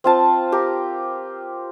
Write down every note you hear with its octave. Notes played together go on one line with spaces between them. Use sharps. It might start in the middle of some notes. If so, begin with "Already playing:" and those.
C4 F4 A5
G4 A#4